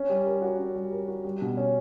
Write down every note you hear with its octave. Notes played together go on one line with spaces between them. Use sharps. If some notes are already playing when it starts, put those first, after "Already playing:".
Already playing: C#4
G3
A#4
F#4
C#4
G3
A#4
F#4
G3
B2
C#4